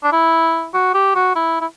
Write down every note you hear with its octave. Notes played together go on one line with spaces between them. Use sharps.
D4
E4
F#4
G4
F#4
E4
E4